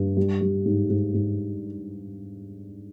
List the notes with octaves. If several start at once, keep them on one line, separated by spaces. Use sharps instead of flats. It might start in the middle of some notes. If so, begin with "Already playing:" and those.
Already playing: G2
G3
G3
G#2
G#2
G#2